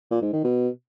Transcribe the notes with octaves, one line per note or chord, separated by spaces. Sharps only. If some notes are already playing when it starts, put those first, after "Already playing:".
A#2
G#2
D#3
B2